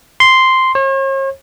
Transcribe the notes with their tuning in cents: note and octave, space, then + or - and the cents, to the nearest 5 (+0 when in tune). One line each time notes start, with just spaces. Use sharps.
C6 -5
C#5 -45